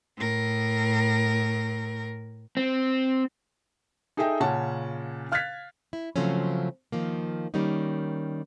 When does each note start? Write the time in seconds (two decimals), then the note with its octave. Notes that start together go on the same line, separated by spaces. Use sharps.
0.17 A2 A#4
2.57 C4
4.17 D#4 G#4 A4 D#5 E5 G5
4.40 A#2 C#3 C#4 F#5 A5
5.32 F5 F6 F#6 G#6 A6 B6
5.93 E4
6.16 C#3 F3 F#3 A3 C4 C#4
6.92 D#3 F3 A#3
7.54 D#3 G3 A#3 C#4 D#4